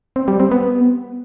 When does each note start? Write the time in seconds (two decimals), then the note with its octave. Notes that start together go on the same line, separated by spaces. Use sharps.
0.16 C4
0.28 G3
0.40 C4
0.51 B3